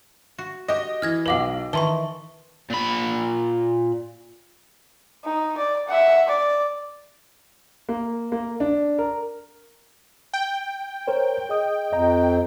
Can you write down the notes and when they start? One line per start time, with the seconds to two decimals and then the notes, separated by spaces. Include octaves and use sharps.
0.38 F#4
0.68 F#4 G4 D#5
1.02 E3 F6 G#6 A#6
1.26 B1 B4 F5 F#5 D6 F#7
1.73 D#3 E3 B4 A5 C6 C#6
2.70 A#2 B5
5.25 D#4
5.57 D5
5.88 E5 F#5
6.28 D5
7.89 A#3
8.32 A#3
8.60 D4
8.99 A#4
10.33 G5
11.08 A#4 C5 C#5
11.49 G#4 D#5 D#6
11.93 F2 D#5 A#5